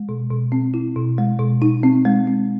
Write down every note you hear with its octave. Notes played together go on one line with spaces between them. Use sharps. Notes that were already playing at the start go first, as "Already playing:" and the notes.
Already playing: G#3
B2
B2
C4
E4
B2
G#3
B2
D#4
C4
G#3
C4